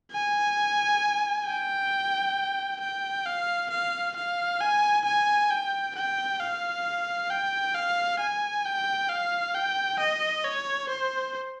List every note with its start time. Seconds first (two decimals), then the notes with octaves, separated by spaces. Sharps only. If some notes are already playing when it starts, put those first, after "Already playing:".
0.12 G#5
1.46 G5
2.80 G5
3.26 F5
3.70 F5
4.16 F5
4.61 G#5
5.05 G#5
5.50 G5
5.95 G5
6.40 F5
7.30 G5
7.75 F5
8.20 G#5
8.65 G5
9.09 F5
9.55 G5
9.99 D#5
10.44 C#5
10.89 C5